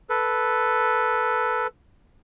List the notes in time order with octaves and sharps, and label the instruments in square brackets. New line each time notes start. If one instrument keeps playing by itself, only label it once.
[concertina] A4 B4